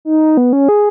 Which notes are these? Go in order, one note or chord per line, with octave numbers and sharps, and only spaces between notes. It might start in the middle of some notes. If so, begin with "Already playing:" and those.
D#4
B3
C#4
G#4